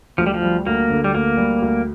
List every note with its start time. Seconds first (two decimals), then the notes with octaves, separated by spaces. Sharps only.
0.18 D2 F3
0.26 G3
0.34 F3
0.42 G3
0.66 D2 A#3
0.90 D3
1.04 G3
1.14 D2 A#3
1.37 G3
1.62 D2